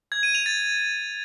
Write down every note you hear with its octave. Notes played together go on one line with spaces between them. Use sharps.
G#6
D#7
F7
A6